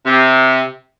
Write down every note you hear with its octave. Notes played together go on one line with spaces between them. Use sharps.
C3